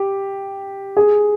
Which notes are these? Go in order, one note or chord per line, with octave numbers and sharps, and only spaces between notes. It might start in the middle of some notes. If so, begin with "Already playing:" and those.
Already playing: G4
G#4